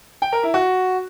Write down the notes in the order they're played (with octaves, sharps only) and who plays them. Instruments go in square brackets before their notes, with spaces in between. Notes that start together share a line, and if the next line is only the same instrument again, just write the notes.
[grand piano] G5
A#4
E4
F#4